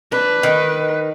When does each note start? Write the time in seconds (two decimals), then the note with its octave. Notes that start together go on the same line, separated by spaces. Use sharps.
0.12 D4 B4
0.43 D#3